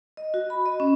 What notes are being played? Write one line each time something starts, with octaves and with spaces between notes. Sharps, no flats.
D#5
F#4
B5
D#5
C#4